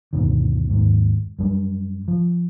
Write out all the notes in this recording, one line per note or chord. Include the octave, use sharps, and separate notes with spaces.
D2 G2 B2 D#3
D#2 G#2
F#2 G3
F3